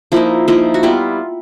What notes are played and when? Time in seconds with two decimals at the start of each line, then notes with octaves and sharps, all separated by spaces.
0.12 F3 A#3 D#4 E4
0.48 F3 A#3 D#4 E4
0.74 F#4
0.83 G3 B3 E4 F4